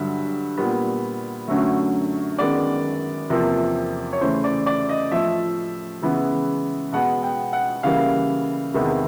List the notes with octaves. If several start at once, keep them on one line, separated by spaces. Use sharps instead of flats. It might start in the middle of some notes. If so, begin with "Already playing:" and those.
Already playing: G2 D3 F#3 E5
A#2 G3 B3
F#2 D3 F#3 A3
F#2 D#3 G#3 B3 D5
E2 C3 F3 A#3
C#5
C#3 E3 A3 C5
D5
D5
D#5
A2 F3 A3 E5
C#3 E3 G#3 B3
B2 G#3 B3 F#5
G5
F#5
C#3 E3 G3 A#3 F5
E2 C3 D#3 G#3 B3